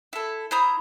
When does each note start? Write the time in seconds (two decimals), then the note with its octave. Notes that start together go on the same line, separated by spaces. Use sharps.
0.13 E4 A4
0.51 E4 C5 A#5 D#6